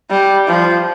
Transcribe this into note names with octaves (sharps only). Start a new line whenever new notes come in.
G3
F3